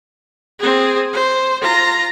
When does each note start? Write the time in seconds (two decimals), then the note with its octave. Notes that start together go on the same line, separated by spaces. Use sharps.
0.60 C4 G#4
1.13 C5
1.62 F4 A#5